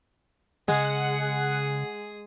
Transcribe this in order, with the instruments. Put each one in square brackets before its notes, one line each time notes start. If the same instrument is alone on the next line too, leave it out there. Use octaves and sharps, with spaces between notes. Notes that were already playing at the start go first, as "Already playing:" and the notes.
[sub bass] C#3 [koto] G#3 [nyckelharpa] G#4 D#6 [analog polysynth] F#5